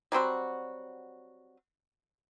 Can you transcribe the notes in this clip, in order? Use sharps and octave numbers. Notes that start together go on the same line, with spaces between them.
F#3 G3 C4 F#4